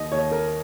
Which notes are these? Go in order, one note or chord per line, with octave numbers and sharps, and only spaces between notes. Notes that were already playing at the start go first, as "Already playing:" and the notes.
Already playing: D#2 D#5
D#2 C#5
A#4